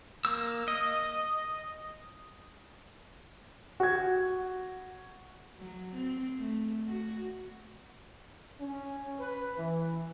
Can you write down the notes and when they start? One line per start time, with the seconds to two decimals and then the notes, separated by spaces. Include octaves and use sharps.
0.25 A#3 E6
0.68 D#5
3.80 F#4 G#6
5.58 F#3
5.95 C4
6.37 A3
6.88 F#4
8.60 C#4
9.19 B4
9.58 E3